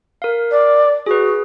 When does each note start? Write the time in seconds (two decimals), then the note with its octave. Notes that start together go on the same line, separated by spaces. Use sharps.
0.22 A#4 F5
0.51 D5
1.06 F#4 G#4 B4